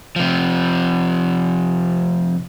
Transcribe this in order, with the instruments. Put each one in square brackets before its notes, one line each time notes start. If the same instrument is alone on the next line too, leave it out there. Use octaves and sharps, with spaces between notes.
[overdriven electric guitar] C3 F3